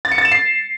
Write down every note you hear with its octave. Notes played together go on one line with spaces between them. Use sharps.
A6
C#7
A6
E7
C7